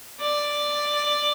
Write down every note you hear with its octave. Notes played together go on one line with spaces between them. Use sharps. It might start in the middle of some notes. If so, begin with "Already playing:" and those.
D5